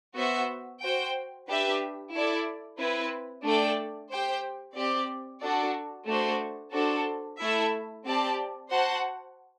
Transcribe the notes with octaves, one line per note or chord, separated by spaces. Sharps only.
B3 F#4 C5 E5
F#4 C5 G5
D4 G4 B4 E5
E4 A4 D5
C4 E4 B4
A3 D4 A4 D5 G5
G4 C5 G5
C4 G4 D5
D4 F#4 A4 D5
A3 D4 F#4 C5
D4 F#4 A4 C5
A3 E4 A4 E5
C4 G4 D5 A5
F#4 C5 F#5 A5